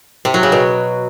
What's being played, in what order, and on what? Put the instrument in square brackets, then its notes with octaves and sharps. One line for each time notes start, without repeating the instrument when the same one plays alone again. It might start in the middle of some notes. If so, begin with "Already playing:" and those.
[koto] C3
F#3
C#3
B2